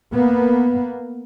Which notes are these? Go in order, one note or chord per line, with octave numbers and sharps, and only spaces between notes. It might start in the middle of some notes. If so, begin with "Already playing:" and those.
A#3 B3